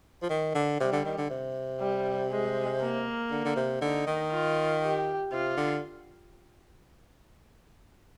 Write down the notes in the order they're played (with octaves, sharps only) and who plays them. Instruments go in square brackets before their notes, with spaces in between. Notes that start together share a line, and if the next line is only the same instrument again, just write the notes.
[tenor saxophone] F3
D#3
D3
[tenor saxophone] C3 [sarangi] G3
[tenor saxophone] D3
D#3
D3
C3
[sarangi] G3
G#3
A#3
[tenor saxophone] D3
D3
C3
[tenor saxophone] D3 [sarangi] D#4
[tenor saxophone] D#3
[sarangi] F4
G4
[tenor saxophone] C3 [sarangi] F4
[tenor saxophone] D3